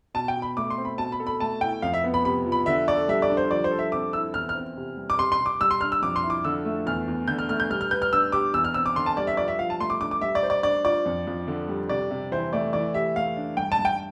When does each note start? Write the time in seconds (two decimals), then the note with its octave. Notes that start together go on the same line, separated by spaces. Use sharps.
0.14 B2 A5
0.28 G5
0.36 B2
0.42 B5
0.57 A3 D6
0.70 C6
0.78 C4
0.85 B5
0.98 B2 A5
1.12 B5
1.20 A4
1.27 B5
1.40 A3 A5
1.61 E4 G5
1.82 F2 F5
1.94 E5
2.04 B3
2.14 B5
2.25 C3 B5
2.46 F3
2.52 B5
2.66 D3 E5
2.87 A4 D5
3.08 G3 E5
3.22 D5
3.30 D4
3.37 C5
3.50 F3 D5
3.64 C5
3.71 A4
3.79 E5
3.92 C4 D6
4.13 E4 E6
4.34 E2 F6
4.49 F6
4.55 C4
4.77 C3
4.97 G3
5.10 D6
5.18 C3 C6
5.32 C6
5.39 C3
5.46 D6
5.60 G3 E6
5.71 C6
5.81 D4 F6
5.92 E6
6.02 F2 D6
6.16 C6
6.23 E4
6.30 D6
6.44 D3 E6
6.65 A3
6.86 E2 F6
7.08 E2
7.28 D3 G6
7.39 F6
7.49 A3 F6
7.60 G6
7.70 G3 F6
7.81 F6
7.91 B4 G6
8.02 F6
8.12 D4 E6
8.32 G4 D6
8.54 E2 E6
8.64 F6
8.74 C4 E6
8.86 D6
8.96 D3 C6
9.06 A5
9.17 G3 D5
9.27 E5
9.37 F3 D5
9.48 E5
9.59 F3 F5
9.70 A5
9.80 A3 C6
9.90 D6
10.01 D4 D6
10.11 D6
10.21 G3 E5
10.35 D5
10.43 C5
10.50 D5
10.63 D4 D5
10.85 F4 D5
11.06 F2
11.27 F2
11.48 D3
11.68 G3
11.89 C3 D5
12.11 C3
12.32 E3 C5
12.53 A3 D5
12.73 E3 D5
12.94 G4 E5
13.16 A3 F5
13.36 D4
13.57 G2 G5
13.72 A5
13.79 G2
13.85 G5